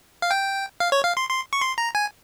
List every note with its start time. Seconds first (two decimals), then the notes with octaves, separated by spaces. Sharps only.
0.22 F5
0.31 G5
0.80 F5
0.92 C#5
1.04 F5
1.17 C6
1.29 C6
1.53 C#6
1.61 C6
1.78 A#5
1.95 G#5